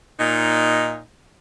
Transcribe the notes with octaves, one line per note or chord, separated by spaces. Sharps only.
A#2 D#4